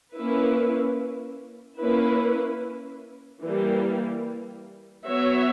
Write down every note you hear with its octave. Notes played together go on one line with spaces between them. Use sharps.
A#3 C#4 E4 B4
A#3 C#4 E4 B4
E3 G3 A#3
F#3 B3 F#4 C#5 E5